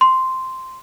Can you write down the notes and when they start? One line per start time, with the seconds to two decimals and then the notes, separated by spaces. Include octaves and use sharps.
0.01 C6